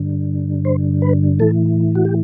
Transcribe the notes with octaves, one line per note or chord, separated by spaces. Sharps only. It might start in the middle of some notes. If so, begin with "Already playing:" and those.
Already playing: G2 D3
C5
B4
A2 E3 A4
F#4
G4